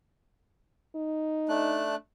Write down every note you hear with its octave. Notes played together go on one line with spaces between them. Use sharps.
D#4
A3 D4 F#6